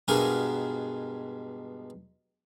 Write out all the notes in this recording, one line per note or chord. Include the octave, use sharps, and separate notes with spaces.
G2 B2 G#3 F#4 A#4